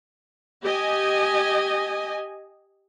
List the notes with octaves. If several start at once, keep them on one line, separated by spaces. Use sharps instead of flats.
G4 D#5 G#5